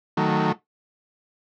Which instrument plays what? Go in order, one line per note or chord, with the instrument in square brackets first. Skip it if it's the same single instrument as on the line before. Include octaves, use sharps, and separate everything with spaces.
[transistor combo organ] D#3 F#3 A3